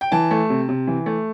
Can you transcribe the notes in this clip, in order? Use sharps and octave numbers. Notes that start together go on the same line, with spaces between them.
G5
E3 A5
A3
C3
C3
E3
A3